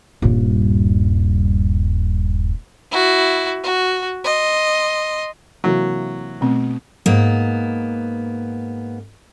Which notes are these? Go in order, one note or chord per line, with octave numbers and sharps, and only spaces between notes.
D#1 G2
E4 F#4
F#4
D#5 C6
C3 E3 F#3 A#3
B2 A3 C4
G#2 A#3 B3